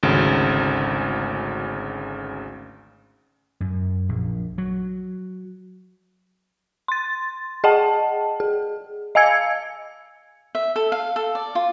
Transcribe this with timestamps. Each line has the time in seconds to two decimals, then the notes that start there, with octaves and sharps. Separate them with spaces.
0.03 G#1 D2 C#3
3.60 F#2
4.09 A#1
4.58 F#3
6.88 C6 A6
7.64 G#4 D#5 F#5 G5 A5
8.40 G#4
9.15 D#5 F5 G#5 E6 G#6 C#7
10.55 E5
10.76 A4
10.92 F5
11.16 A4
11.35 D5
11.55 F4